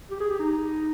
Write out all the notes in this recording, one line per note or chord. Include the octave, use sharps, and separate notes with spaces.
G4
G#4
G4
D#4